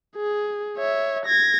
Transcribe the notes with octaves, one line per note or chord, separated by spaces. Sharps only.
G#4
C#5 E5
G#6 A#6